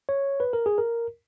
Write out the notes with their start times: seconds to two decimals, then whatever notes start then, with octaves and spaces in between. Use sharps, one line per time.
0.09 C#5
0.40 B4
0.53 A#4
0.66 G#4
0.78 A#4